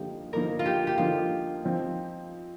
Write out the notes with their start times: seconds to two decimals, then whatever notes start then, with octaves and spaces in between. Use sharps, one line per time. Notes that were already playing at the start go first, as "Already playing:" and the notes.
Already playing: D3 F3 A#3 D#4 G4
0.33 D3 F3 A#3 D#4 A#4
0.59 F4
0.65 G4
0.87 G4
0.98 D3 F3 A#3 D#4 F4
1.63 F3 C4 D#4